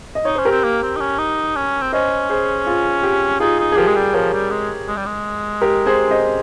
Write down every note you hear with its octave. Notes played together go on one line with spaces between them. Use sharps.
D#5
D#4 C#5
C#4 C5
G4 A#4
C4
A#3
C4
D#4
C#4
D#4
C#4
C4
C#4 C5 D#5
G#4 C5
F4 G#4
G4
D#4 F4 G#4
D#4
G#4
F3 G4 A#4
G#3
G3
F3 A#4 C#5
G3
G#3
G#3
G3
G#3
G4 A#4
G#4 C5
C5 D#5